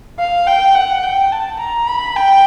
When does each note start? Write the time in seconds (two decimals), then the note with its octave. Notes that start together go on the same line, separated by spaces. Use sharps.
0.19 F5
0.47 G5
0.75 F#5
1.03 G5
1.32 A5
1.59 A#5
1.87 B5
2.16 G5